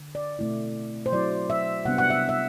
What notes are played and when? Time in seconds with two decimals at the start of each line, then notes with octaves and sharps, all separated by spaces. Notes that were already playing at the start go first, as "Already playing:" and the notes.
Already playing: D3
0.15 D5
0.39 B2 A3 C4 E4
1.06 C5
1.12 F#3 C4 E4 D5
1.50 E5
1.85 C3 G3 B3 D4 F#5
1.98 F#5
2.10 E5
2.29 E5